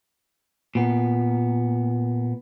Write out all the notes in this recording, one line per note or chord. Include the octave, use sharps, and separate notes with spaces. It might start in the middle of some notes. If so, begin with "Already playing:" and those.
A#2 B3